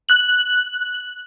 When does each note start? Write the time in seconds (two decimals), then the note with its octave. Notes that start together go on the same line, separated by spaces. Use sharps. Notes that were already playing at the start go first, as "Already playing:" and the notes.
0.09 F#6 F#7